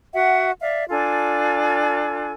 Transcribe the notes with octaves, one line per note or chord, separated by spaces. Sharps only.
F#4 E5 F#5
D5 E5 F5
D4 F4 A4 G#5